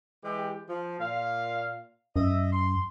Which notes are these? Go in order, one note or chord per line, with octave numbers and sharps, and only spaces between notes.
E3 G#3 G4
F3
A#2 F5
F#2 D#5 E5
C6